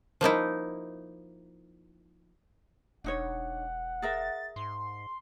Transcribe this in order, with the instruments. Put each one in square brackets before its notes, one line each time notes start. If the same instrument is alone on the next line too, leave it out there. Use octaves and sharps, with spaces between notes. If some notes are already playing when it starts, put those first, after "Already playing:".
[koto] F3 A#3 D#4 E4
[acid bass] E1 [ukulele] D4 D#4 C#5 [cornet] F#5
[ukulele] G#4 A#4 E5 [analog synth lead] A6
[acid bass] G#2 [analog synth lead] C6